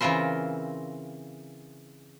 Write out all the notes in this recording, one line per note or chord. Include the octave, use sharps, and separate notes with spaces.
C#3 E3 C4 F4 A#4 C5